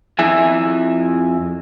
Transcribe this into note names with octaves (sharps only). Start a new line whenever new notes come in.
F2 E4 G#4 E5 G#5